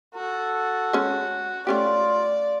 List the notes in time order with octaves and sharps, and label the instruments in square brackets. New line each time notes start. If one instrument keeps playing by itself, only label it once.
[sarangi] F#4 [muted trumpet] A4
[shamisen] G#3 C#4
[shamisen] A3 C#4 G4 [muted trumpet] F4 [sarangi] D5